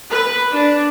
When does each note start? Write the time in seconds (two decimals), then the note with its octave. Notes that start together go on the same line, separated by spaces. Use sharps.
0.11 B4
0.53 D4